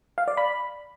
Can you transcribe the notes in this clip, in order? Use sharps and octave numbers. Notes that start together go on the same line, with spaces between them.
F5
D5
B5